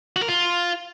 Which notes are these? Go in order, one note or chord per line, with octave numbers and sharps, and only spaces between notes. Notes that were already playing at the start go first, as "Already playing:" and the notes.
F#4
A#4
F4